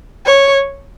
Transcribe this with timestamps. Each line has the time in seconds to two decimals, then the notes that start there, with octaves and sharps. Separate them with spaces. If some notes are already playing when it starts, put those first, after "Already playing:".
0.25 C#5